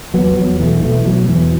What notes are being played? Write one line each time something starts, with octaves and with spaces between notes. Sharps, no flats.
E2 F#3 B3
E2 F#3
B2 E3 A3
B2 E3 A3
B2 F#3
E2 E3